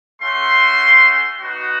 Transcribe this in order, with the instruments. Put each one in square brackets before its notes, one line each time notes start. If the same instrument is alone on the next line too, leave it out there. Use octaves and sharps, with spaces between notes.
[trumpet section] A3 C#4 F#4 C6
B3 D#4 F#4